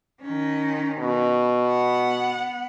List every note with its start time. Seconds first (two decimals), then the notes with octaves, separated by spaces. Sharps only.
0.23 D#3 C#4
0.98 B2
1.64 B3 F#5